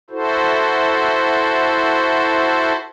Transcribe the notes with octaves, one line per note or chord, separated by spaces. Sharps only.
E4 F#4 A4 C5